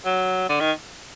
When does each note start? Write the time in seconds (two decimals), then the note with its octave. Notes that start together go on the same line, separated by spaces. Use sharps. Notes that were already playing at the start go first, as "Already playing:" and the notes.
0.05 F#3
0.49 D3
0.60 D#3